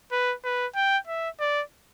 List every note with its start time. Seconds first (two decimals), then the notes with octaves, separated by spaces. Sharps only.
0.12 B4
0.45 B4
0.75 G5
1.07 E5
1.40 D5